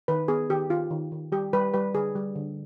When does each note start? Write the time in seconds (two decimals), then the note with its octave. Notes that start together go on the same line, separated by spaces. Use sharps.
0.08 D#3 B4
0.28 B3 G#4
0.50 D#3 G4
0.70 D#3 F4
0.91 D#3
1.12 D#3
1.32 G3 G4
1.53 G3 B4
1.74 G3 B4
1.94 D3 G#4
2.16 G3
2.36 D3